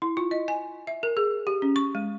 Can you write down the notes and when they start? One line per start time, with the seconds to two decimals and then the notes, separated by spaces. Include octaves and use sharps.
0.02 E4
0.17 F4
0.31 D#5
0.48 G#5
0.87 E5
1.03 A#4
1.17 G#4
1.47 G4
1.62 C#4
1.76 C#6
1.95 G#3